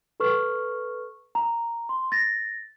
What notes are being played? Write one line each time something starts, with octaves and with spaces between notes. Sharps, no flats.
A4 B4 C#6 F6
A#5
C6
A6 A#6